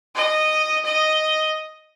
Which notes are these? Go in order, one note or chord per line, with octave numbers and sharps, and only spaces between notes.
D#5
D#5